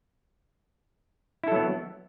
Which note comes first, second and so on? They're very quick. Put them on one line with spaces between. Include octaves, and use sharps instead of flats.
E4 A4 F#3 B3